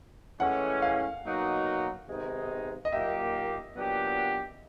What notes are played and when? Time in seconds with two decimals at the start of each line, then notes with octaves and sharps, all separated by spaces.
0.39 A2 E3 G#3 C#4 F#5
0.82 F5
1.24 B2 F#3 A#3 D#4 F#4
2.08 C3 D#3 G#3 B3 D#4
2.85 D#5
2.92 A#2 F#3 A#3 D#4 G4 E5
3.76 A#2 F#3 B3 D4 G4